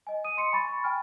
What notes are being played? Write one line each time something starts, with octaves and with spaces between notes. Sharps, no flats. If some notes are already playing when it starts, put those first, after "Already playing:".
D#5 G#5
D#6 D#7
C6 C#7
G#5 B5 C#6 A6
G5 G#5 F6